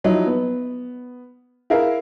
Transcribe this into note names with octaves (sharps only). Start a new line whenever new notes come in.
F3 F#3 D#4 E4
B3
E4 G#4 A#4 F5